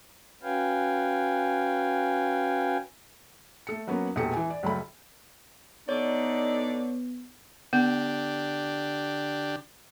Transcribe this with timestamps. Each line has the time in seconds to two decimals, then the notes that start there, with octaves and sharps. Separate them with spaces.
0.43 C#4 F#4 B4 F5 G5 G#5
3.67 A3 A4 C#7
3.87 F#3 A#3 B3 C#4
4.16 E1 E2 A#2 G4 A4 C#7
4.33 E3 G#5
4.50 D5
4.63 C#2 F#2 A3 B5
5.89 D3 B3 D#4 C#5 D5
7.73 D3 B3 D4 G4